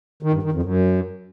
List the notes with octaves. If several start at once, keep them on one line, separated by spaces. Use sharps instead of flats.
D#3
G2
D#3
F2
F#2